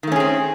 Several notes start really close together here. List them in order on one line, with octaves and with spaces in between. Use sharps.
D#3 A3 C#4 G#4 C4